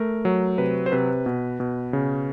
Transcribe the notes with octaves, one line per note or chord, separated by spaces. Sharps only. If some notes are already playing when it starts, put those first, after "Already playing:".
Already playing: A3 A#4
F#3
C3 B4
C5
C3 B4
B2
B2
C#3